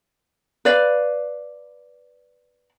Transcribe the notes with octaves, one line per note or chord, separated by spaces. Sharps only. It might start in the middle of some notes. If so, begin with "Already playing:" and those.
B4 D5 F5